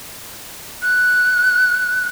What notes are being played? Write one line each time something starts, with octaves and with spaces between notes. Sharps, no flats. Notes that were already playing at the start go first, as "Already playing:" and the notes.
F#6